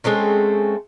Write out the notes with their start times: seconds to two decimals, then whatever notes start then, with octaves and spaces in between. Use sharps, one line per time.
0.04 G#3 A3 C4 C#4